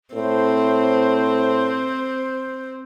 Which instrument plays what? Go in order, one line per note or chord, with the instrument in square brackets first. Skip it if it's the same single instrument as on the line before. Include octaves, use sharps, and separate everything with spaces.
[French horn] A2 [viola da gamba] C4 [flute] C5